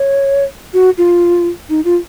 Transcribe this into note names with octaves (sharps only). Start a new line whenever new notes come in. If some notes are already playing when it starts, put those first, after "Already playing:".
Already playing: C#5
F#4
F4
D#4
F4